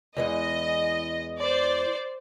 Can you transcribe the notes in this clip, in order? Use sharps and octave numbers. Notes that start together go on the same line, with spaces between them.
E2 E3 G#3 D#5
C5 D5